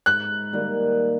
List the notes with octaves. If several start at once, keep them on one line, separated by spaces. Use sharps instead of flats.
G#2 F#6
D#3 G3 A#3